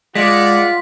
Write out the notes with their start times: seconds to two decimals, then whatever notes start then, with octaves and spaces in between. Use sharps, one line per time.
0.15 G#3 F4 D5 F#5 B6